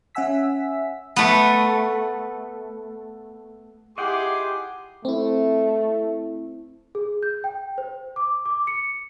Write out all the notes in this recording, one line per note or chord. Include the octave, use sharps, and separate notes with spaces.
C#4 E5 F#5 G#5 E6 B6
A3 B3
E4 G4 G#4 D#5 F#5 G5 C6 D6
A3 C4 E4
G#4
G6
G5
C5
D6
D6
C#7